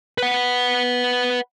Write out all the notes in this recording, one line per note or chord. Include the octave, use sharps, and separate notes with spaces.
B4 F#5